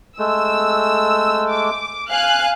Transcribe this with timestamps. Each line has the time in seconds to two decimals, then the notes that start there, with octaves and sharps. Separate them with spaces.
0.19 G#3 A3 E6
1.52 D6
2.09 F5 G#5 F#6